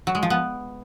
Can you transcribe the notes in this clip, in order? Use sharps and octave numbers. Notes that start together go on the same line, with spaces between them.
F#3
G#3
F3
B3